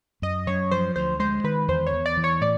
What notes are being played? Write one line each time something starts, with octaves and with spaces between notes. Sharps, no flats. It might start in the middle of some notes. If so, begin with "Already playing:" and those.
F#2 D#5
F#2 C#5
F3 C5
D2 C5
G#3 C5
D#3 B4
E2 C5
C#5
E2
D5
E3
C#5
A2 D5